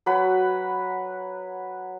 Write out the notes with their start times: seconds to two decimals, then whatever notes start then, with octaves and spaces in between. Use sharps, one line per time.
0.06 F#3 B4 F#5 B5